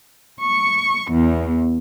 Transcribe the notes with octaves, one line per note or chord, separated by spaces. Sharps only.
C#6
E2